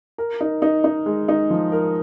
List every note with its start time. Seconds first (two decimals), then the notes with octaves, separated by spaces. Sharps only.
0.18 A#4
0.41 D#4
0.62 D#4
0.84 D#4
1.06 G#3
1.28 D#4
1.50 F3
1.72 A#4